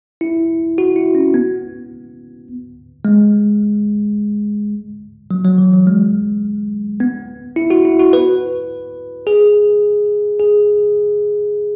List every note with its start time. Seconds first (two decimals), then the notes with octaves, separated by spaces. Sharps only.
0.21 E4
0.78 F#4
0.96 E4
1.15 C#4
1.34 B3
3.05 G#3
5.31 F#3
5.45 F#3
5.58 E3
5.73 F#3
5.87 G#3
7.00 B3
7.56 E4
7.70 F#4
7.85 E4
7.99 F#4
8.13 B4
9.27 G#4
10.40 G#4